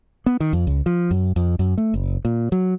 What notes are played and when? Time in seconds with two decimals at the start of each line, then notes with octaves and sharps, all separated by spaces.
0.26 B3
0.40 D#3
0.53 F2
0.67 C#2
0.86 F3
1.11 F#2
1.36 F2
1.59 F#2
1.78 A3
1.94 F#1
2.25 A#2
2.52 F#3